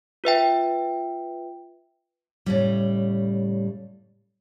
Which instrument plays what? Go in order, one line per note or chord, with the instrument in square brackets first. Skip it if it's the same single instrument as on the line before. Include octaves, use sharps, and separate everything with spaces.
[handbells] F4 B4 E5 G5
[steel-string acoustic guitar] A2 C#3 G3